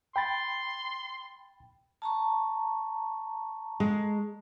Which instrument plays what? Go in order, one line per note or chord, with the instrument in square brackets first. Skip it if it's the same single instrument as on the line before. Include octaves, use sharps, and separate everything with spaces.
[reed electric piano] G5 B5 A6 [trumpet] C6
[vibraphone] A5 A#5 C#6
[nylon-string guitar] G#3